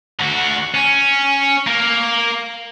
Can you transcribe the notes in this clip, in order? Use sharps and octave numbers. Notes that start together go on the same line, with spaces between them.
D3 F#4
C#4
A#3 A#4